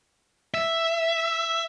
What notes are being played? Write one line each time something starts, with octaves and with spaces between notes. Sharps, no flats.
E5